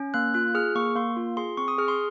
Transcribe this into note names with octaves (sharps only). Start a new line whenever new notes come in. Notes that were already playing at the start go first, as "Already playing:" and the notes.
Already playing: C#4
A#3 F#6
F4 F#6
G#4 F6
A#3 C#6
A#3 C6
F4
G#4 C6
C4 C#6
D#6
G#4 F6
C6